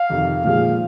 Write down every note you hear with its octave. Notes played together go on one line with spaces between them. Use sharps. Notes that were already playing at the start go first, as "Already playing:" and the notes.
Already playing: F5
F2 C3 D#3
A#2 F3 G#3 F5